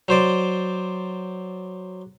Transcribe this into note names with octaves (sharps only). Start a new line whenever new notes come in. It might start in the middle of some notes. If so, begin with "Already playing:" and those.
F#3 C5 D5